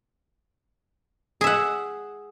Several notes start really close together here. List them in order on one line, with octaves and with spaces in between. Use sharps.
G#4 E5 F#5